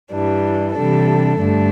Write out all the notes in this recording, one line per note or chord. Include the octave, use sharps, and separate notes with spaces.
G2 E3 G3 D4
C3 E3 G3 D4 A4
G2 D3 A3 D4